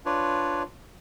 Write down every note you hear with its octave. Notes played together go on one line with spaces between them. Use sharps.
D4 F4 B4 C#5 D5